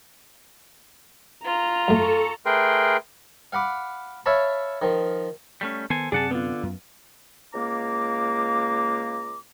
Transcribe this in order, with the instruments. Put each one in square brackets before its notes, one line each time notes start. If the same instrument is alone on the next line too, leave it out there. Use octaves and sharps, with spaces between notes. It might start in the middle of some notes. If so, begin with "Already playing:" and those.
[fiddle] F4 [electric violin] A#5
[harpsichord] F#2 A3 [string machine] A4 C#6
[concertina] A3 G#4 A#4 B4 G5 C6
[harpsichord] F5 F#5 B5 D6
C#5 E5 F5 A5 B5
D#3 F3
[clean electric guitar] G3 A3 C#4
[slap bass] D#3 B3 [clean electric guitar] A4 C5 G#5
[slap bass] F#2 C3 C4 [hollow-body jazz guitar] G#4 [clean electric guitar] D5 F#5 A5
[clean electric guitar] D3 [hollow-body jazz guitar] B3 F4
[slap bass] F#2
[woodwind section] C#2 A#3 A#5 D6